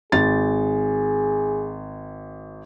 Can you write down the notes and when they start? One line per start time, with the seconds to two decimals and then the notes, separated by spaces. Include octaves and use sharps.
0.12 G#1 G#4 A6